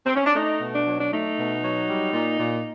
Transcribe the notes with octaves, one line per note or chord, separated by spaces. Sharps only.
C4
C#4
D4
A3 D#4
B2
D4
F#3
D4
A3 D#4
B2
F#3
G3
A#2
A#2